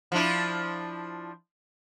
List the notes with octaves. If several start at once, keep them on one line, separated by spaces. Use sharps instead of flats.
F3 D4 E4